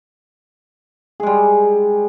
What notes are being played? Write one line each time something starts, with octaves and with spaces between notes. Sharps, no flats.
G3 G#3 G#4